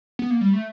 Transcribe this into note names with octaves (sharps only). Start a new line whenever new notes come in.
B3
A#3
G3
A3